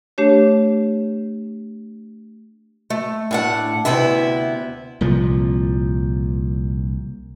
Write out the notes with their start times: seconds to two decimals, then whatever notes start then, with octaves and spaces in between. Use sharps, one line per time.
0.18 A3 D4 G4 C#5
2.90 A3
3.31 A2 D4 F#5
3.85 D2 C3 B3 E4 E5
5.01 C2 A#2 F3